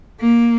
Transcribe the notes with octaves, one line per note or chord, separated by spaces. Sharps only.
A#3